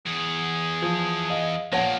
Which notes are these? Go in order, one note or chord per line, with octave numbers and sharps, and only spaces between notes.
E2 G#4
F3
D#5 F5
A#1 F3 A#3 C#5 F#5 A5 A#6